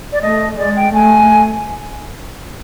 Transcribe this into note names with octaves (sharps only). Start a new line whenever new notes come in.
D5
A3 D#5
G#3 D5
G5
A3 G#5